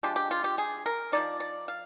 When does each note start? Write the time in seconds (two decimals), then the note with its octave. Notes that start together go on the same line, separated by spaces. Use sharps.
0.03 F3 G#3 D4 G4
0.16 G4
0.31 F4
0.44 G4
0.58 G#4
0.86 A#4
1.12 F3 C4 D#4 D5
1.40 D5
1.68 F5